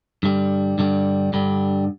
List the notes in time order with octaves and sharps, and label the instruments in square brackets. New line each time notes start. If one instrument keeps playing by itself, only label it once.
[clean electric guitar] G2 D3 G3
G2 D3 G3
G2 D3 G3